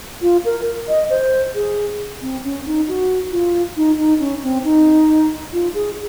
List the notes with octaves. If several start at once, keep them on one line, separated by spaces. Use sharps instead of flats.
F4
A#4
D#5
C5
G#4
C4
C#4
D#4
F#4
F4
D#4
D#4
C#4
C4
D#4
F4
G#4